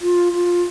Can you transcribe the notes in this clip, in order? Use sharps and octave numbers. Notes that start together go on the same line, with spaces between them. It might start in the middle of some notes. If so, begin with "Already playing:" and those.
F4
F4